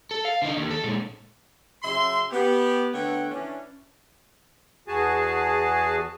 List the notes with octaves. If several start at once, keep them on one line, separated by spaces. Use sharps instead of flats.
A4
F5
D3 D#4
D#2
A4
A#2 G#3
C#3 F#3 E5 C6
B3 G4
D3 A3 B3 C#5 F#5 G5
E3 C#4 D4
E2 F#4 G#4 G#5 A5